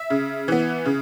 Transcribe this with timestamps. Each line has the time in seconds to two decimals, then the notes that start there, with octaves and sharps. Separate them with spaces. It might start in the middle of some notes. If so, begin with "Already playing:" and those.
Already playing: E5
0.10 C#3
0.48 E3 B3
0.85 C#3